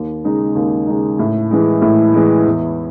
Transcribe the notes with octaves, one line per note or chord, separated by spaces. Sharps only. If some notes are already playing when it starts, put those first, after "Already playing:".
Already playing: D#2
C#3 G#3 D#4
D#2
C#3 G#3 D#4
A2
E3 G#3
A2
E3 G#3
E2